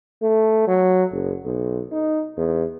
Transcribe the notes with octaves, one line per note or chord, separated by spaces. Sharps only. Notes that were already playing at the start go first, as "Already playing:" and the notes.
A3
F#3
F#1
B1
D#4
E2